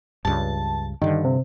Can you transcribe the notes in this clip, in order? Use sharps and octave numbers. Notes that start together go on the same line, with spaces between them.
C#2 G2 A5
G2 D3 D#3
C3